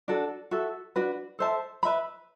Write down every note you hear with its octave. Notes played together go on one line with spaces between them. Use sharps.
D4 F#4 A4
F#4 A4 E5
D4 F#4 B4
A4 C5 E5 A5
B4 E5 B5